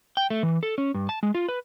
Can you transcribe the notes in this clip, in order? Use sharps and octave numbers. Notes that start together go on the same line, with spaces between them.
G5
A3
E3
A4
C#4
G2
A5
G#3
F4
B4